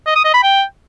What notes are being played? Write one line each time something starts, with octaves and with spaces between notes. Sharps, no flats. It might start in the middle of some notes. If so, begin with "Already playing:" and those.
D#5
D#6
D#5
B5
G5